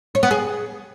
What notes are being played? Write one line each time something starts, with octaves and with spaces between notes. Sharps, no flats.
C#5
B3
G#4